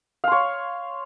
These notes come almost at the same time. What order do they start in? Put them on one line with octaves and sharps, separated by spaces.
F5 C6 C#5